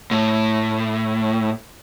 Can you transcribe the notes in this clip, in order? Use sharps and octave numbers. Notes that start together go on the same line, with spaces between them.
A2